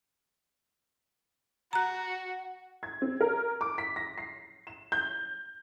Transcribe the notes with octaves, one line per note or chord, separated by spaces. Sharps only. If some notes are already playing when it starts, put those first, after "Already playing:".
F#4 F#5 A#5 F#6
G#6
C4
A#4
D6
B6
A#6
C7
E7
G6